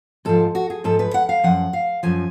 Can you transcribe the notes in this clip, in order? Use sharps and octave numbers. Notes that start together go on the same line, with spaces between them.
G#2 F3 A4
F#4
G#4
G#2 F3 A4
B4
F#5
F5
F#2 F3 F#5
F5
F#2 F3 G#5